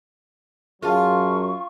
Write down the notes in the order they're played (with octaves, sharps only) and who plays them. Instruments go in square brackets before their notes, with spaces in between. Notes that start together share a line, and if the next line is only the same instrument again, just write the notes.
[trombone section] F#2 F#3 [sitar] F4 [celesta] G#4 A5 F6 [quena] C#6